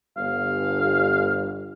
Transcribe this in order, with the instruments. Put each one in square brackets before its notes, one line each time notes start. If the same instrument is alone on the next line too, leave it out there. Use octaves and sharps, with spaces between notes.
[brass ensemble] G1 [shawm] F5